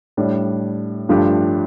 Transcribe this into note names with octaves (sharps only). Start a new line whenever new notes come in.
A2 G3 D4
G2 F3 A3 D4 G4